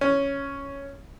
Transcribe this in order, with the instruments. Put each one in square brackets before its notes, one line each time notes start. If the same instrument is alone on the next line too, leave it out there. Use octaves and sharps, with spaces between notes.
[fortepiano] C#4